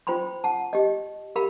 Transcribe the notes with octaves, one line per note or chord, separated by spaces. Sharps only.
F4 C5 G5 B5 C6
F#5 A5
G4 D#5
G4 A#4 F5 B5